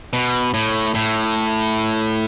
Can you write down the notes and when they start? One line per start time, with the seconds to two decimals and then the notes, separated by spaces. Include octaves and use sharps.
0.13 B2
0.54 A2
0.95 A2